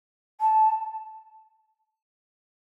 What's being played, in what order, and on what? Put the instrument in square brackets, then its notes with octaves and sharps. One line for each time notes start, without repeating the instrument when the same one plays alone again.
[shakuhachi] A5